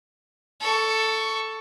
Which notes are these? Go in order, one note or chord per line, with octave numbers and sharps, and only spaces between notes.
A4 C#6